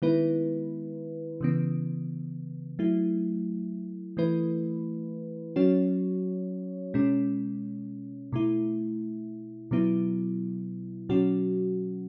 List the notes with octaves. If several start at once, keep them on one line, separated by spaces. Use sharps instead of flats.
D#3 G#3 B3 E4 B4
C#3 E3 B3
F#3 A3 E4
E3 A3 E4 B4
F#3 C#4 F#4 C#5
B2 G#3 C#4
B2 A3 E4
B2 F#3 B3 E4
B2 F#3 C#4 F#4